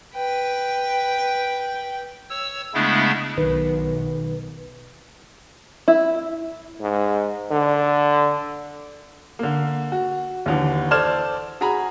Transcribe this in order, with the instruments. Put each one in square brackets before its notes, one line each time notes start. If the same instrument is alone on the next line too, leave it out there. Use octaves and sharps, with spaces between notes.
[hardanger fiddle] B4 G5
[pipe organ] C#5 E6
C#3 G#3 A3 B3 D4 E4
[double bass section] B1 [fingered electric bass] D#3 [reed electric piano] B4
[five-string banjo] E4
[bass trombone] G#2
D3
[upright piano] D3 A#3
F#4
D#2 D3 E3
A4 C5 D5 F6 G#6 E7
F#4 G#4 G#5 A#5 B5